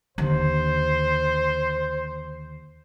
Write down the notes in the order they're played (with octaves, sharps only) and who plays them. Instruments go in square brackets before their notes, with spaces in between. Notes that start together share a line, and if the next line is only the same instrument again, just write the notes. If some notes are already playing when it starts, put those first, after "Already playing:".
[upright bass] D#2 D3 [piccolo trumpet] C5